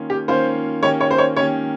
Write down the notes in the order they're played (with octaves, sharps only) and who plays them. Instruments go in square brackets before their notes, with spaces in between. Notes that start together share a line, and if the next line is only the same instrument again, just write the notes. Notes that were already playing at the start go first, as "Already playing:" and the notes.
Already playing: [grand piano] D#3 A#3 C#4 F4
[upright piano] G4
[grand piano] D#3 A#3 C#4 F4 [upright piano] C5
[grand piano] D#3 A#3 C#4 G4 [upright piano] C#5
[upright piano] C#5
C5
C#5
[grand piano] D#3 A#3 C#4 G4 [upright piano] C#5